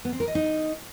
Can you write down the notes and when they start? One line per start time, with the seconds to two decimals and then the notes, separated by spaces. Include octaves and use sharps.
0.05 B3
0.12 C4
0.20 A#4
0.28 D#5
0.35 D#4